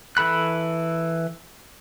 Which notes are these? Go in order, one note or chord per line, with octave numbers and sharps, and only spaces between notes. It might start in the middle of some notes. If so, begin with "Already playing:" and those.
E3 A4 B5 F#6